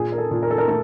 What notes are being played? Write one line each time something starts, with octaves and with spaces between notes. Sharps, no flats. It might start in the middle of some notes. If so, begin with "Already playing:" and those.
Already playing: A#2 G#4
A#4
A4
A#2
A#4
A4
A#4
A3 A4